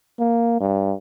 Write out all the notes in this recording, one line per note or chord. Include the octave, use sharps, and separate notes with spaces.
A#3
G2